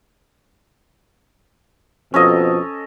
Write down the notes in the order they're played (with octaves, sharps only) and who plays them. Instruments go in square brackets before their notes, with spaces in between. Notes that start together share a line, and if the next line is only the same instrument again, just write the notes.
[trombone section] F2 B2 F3 [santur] C#4 A4 D#5